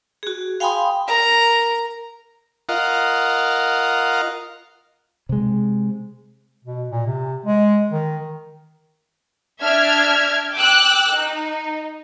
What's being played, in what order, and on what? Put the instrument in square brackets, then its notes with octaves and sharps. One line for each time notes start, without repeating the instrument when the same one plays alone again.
[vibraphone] F#4 G#4
F5 G5 G#5 B5 C6 D#6
[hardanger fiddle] A#4 A#5
[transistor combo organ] F4 A#4 D#5 F5 F#5
[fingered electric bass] C3 G#3
[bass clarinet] B2
A#2
C3
G#3
D#3
[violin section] D4 E5 F6 G#6
G5 D6 E6 F#6
D#4